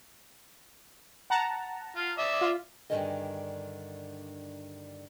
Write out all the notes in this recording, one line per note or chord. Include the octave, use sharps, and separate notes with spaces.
F#5 A5 A#5
F4
D5 E5
F4
G2 B2 D3 D#3 G#4 D#5